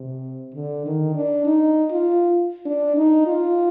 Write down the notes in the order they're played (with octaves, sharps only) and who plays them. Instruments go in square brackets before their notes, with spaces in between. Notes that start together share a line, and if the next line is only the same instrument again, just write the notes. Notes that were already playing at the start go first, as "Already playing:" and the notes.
Already playing: [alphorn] C3
D3
D#3
D4
D#4
F4
D4
D#4
F4